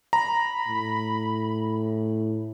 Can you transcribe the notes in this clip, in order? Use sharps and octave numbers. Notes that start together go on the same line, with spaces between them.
A#5 B5
A2